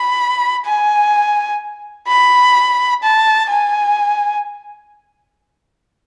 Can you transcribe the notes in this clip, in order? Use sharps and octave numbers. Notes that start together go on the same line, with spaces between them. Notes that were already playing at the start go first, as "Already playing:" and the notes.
Already playing: B5
G#5
B5
A5
G#5